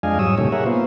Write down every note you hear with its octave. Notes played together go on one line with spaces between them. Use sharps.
F2 G#3 D4 D#5 F5 G#5
G#2 F#3 G3 C#5 D#6 E6
A#2 C#3 A3 D#4 G4 C#5
G#4 A#4 C#5 E5 F#5
A#3 B3 F4 C5